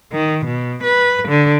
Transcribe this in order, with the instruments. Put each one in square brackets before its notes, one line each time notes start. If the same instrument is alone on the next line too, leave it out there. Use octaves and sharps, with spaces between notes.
[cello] D#3
B2
B4
D3